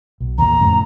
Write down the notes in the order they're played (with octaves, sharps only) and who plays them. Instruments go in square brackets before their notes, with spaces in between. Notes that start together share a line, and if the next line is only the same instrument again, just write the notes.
[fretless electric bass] B1
[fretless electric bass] A1 D#2 [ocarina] A#5
[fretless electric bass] F2 A2 C#3